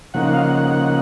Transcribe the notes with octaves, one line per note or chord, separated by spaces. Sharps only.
C#3 F3 A#3 D#4 F#5
F5
F#5